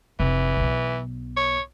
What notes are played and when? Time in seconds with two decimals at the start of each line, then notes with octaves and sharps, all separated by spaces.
0.20 F1 E3
0.57 B1 B2
1.37 C#5